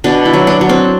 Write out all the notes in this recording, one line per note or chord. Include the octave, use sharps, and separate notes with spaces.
B2 D4
E4
F#3
D4
F#3
C4